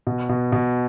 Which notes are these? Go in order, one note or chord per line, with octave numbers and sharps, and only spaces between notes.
B2
B2
B2